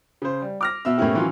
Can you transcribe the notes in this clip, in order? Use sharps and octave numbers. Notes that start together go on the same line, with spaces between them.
C#3 C5
G3
D6 F6 A#6
B2 E5 E6
A2 A#3 B3 C#4 E4 G4
D#3 E3 F#3 C#4 F4